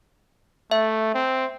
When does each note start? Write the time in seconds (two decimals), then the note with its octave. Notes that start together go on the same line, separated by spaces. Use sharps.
0.71 A3 E5
1.14 C4